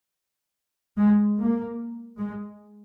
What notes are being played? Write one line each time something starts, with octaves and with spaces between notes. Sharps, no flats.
G#3
A#3
G#3